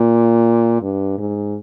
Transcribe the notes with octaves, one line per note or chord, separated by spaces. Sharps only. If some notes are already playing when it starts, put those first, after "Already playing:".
Already playing: A#2
G2
G#2